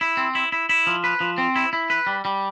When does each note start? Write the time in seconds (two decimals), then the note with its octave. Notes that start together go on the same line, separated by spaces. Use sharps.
0.01 E4
0.17 C4
0.35 E4
0.52 E4
0.69 E4
0.87 F3
1.04 B4
1.20 F3
1.38 C4
1.56 E4
1.73 E4
1.90 B4
2.07 G3
2.25 G3